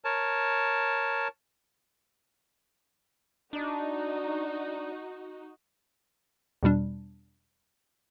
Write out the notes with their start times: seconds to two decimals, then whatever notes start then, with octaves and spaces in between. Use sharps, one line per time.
0.05 A#4 C#5 A5
3.53 D4 D#4 F#4
6.63 E2 B2 G3 D4